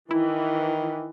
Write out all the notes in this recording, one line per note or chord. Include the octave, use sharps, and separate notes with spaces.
D#3 E3 E4